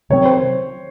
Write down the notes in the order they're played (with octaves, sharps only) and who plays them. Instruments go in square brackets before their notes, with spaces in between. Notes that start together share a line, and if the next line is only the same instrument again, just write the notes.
[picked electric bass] C3 D#3 F#3 C4 [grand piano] C#5
[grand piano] C5